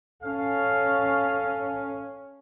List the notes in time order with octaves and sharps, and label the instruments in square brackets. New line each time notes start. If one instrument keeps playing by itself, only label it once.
[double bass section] C#4 [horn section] A4 F5